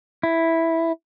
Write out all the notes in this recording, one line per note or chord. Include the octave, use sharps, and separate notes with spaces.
E4